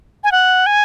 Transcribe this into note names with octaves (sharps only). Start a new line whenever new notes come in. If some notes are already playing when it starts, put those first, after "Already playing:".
G#5
F#5
G#5